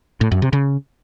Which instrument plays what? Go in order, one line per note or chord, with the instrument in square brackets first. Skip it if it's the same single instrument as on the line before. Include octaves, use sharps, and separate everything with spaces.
[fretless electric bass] A2
F#2
C3
C#3